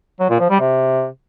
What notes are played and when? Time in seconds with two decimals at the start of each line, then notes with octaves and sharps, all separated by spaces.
0.20 F#3
0.30 A#2
0.40 F3
0.50 G3
0.60 C3